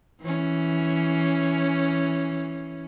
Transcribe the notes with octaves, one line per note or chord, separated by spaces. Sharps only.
E3 C#4